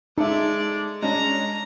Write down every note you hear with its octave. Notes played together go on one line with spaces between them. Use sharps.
G#3 D#4 A4 D5 E5
G#3 C#4 D4 A#5